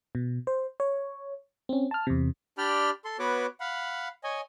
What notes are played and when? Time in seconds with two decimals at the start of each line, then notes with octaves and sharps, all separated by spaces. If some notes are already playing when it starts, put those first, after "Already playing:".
0.15 B2
0.47 C5
0.80 C#5
1.69 C4 C#4
1.91 A5 F6
2.07 E2 C3
2.58 D4 G4 D5 G5 B5 F6
3.05 A4 C6
3.19 B3 F#4 B4 C#5 D6
3.60 F5 F#5 B5
4.24 C#5 D#5 G#5